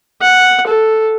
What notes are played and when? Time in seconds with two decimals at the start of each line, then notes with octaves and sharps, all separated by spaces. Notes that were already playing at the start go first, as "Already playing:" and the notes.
0.22 F#5
0.67 A4